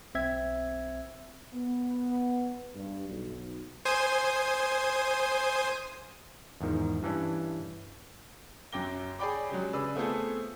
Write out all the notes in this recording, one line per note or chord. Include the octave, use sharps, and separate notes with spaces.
B1 C4 E5 G#6
B3
G2
B1
C5 G#5 D#6
E2 G#2 D#3 F3
G2 E3 C#4 D4
F#2 F#3 G5 D6 A#6 G7
G#4 C#5 D5 G5 B5 D6
F#3 G#3 C#4 G4
C#3 G#4 B4 D5 E6
A3 B3 C4 F4 G#4 A4